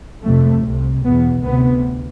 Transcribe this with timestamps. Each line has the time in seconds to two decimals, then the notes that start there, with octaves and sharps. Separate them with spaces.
0.23 F2 C3 A3
0.63 C2 C3
1.03 E2 B2 B3
1.43 D2 C3 B3